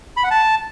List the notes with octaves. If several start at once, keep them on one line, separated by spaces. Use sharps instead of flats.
B5
F#5
A5